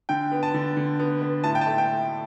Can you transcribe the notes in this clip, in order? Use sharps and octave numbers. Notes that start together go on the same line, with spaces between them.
D3 G5
B3
A5
D3
D3
B3
B3
A2 A5
G5
A5
A3
G5